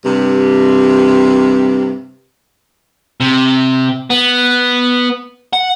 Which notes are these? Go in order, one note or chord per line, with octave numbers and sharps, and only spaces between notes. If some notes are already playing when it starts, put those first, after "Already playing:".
G2 C3
C3
B3
F#5